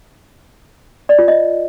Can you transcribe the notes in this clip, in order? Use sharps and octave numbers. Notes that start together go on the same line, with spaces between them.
D5
F4
D#5